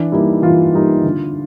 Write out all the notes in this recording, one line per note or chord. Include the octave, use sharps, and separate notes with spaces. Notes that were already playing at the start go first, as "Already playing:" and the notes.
Already playing: E3 D4
G3 A#3 D#4 E4
E3 F4
G3 A#3 D#4
D3